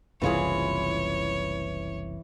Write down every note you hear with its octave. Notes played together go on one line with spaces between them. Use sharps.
F#1 C2 E3 F4 G#4 C#5